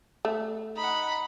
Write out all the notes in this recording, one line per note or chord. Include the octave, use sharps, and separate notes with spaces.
A3
D#4 F#5 B5